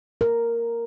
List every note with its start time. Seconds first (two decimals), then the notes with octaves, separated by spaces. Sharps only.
0.21 A#4